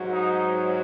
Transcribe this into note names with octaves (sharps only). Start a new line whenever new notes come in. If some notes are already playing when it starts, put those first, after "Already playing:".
Already playing: G#2 F#3
D#4